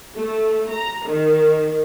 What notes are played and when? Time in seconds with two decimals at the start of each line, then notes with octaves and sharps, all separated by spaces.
0.14 A3
0.71 A#5
1.07 D#3